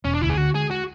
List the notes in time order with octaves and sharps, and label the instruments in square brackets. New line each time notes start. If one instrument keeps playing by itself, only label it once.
[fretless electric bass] E1 [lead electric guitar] C#4
[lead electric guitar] D4
[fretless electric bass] D2 [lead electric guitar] E4
[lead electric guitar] G#4
[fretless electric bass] D3 [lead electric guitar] F#4
[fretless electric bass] G#3 [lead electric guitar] G#4
[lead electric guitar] F#4